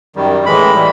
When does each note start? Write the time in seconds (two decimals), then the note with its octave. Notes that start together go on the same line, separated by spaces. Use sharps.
0.16 F#2 D#3 G3
0.45 A2 E3 G#3 B5
0.75 E3 G3